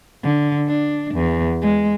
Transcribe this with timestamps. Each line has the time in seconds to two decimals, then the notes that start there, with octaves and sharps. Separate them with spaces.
0.22 D3
0.66 D4
1.14 E2
1.62 G#3